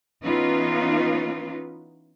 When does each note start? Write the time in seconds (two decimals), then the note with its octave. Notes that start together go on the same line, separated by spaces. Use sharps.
0.21 E3 B3 C#4 D#4 F4 B4